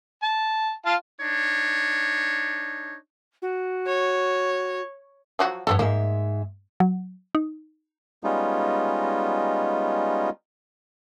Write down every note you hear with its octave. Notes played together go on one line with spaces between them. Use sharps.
A5
F4 F5 A5
D4 D#4 C#5
F#4
C#5
F3 F#3 F#4
G2 B3 C4 A4 C#5
G#2 G#3 A#3 E5
F#3
D#4
G3 G#3 B3 C#4 D#4 F4